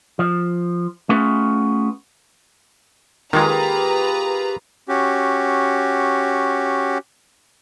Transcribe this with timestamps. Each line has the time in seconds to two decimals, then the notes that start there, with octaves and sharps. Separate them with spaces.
0.19 F3
1.09 A3 B3 C#4 F4 G#4 B4
3.33 D#3 G#3 A#3 F4 G4 G#4 B4 A#5
4.88 C#4 F#4 G4